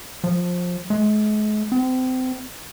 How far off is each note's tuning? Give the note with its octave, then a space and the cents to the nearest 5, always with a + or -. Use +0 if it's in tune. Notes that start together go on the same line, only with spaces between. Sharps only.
F3 +20
G#3 +40
C4 -30